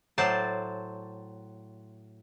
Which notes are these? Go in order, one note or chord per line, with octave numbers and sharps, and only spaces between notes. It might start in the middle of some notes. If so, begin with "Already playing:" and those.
A2 F#3 C5 D5 A5